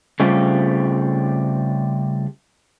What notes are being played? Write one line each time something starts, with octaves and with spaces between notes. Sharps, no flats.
C#3 G3 A3 C4 F4 G4